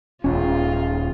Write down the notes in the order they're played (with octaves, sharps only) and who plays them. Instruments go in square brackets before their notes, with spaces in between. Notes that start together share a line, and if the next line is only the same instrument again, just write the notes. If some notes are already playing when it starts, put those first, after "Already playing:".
[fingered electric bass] D#1 C#4 [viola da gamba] G#3 F4